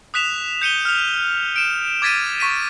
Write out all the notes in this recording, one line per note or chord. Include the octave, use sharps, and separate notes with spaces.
D#6 F#6 B6 E7 F7
G6 C#7 D#7 G7
F6 F7
D7 E7
D6 G#6 A6 B6 D7 D#7
C#6 B6 D#7